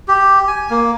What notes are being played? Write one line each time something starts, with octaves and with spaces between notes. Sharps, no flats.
G4
G#5
A#3